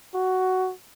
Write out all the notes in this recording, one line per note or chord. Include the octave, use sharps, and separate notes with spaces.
F#4